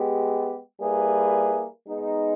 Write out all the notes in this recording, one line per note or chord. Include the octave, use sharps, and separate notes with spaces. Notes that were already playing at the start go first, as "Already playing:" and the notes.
Already playing: G#3 B3 G4
G3 A#3 E4 G#4 B4
G#3 B3 D#4